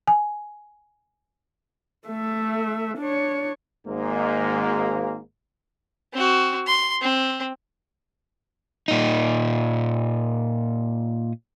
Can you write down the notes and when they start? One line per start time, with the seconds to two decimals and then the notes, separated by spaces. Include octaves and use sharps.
0.08 G#5
2.08 A3 E5
2.98 D4 C#5
3.87 G#1 G#2 A#3
6.13 C4 F#4
6.67 C6
7.01 C4
8.88 A#2 D#4